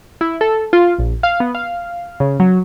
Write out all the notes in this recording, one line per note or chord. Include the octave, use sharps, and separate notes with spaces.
E4
A4
F4
A#1
F5
B3
F5
C#3
F#3